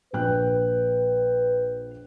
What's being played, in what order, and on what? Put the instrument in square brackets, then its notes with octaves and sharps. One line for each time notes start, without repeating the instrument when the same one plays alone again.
[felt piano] A#1 G5 F#6 [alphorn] B4